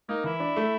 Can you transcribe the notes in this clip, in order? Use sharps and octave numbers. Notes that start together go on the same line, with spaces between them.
A#3 D#4
E3 E4
D4
A3